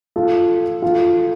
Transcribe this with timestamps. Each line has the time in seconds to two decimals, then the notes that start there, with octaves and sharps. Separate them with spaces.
0.16 F4 A4
0.82 F4 A4